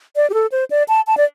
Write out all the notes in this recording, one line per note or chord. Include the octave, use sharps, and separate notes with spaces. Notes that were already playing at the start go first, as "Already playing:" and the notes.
D5
G4
A4
C5
D5
A5
A5
D5